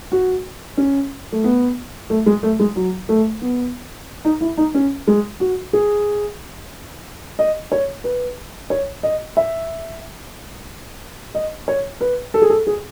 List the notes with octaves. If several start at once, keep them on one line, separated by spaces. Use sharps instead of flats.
F#4
C#4
A3
B3
A3
G#3
A3
G#3
F#3
A3
B3
D#4
E4
D#4
C#4
G#3
F#4
G#4
D#5
C#5
B4
C#5
D#5
E5
D#5
C#5
B4
A4
G#4
A4
G#4